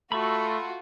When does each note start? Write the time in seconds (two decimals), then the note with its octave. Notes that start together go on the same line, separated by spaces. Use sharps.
0.12 A3 F4 F#4 B5 C#6 E6